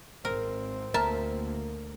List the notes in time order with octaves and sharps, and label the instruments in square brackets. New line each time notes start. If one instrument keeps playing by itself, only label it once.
[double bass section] G#1 G#2 [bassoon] C4 [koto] A#4
[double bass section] D2 A#3 [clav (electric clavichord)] A#4 [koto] E5 A5